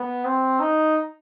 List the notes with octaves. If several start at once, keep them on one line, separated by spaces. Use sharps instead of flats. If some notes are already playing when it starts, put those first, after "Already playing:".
Already playing: B3
C4
D#4